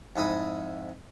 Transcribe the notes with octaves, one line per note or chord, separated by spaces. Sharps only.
F2 G#2 E4 D#6